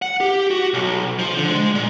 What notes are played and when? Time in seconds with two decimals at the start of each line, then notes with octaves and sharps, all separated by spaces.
0.02 F#5
0.20 G4
0.51 F#4
0.74 B1
1.19 F3
1.37 D3
1.49 G#3
1.75 A#2